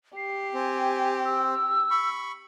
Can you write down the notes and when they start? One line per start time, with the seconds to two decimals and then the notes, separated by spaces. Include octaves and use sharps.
0.17 G4 C7
0.54 C4 G#5
1.25 E6
1.90 B5 C#6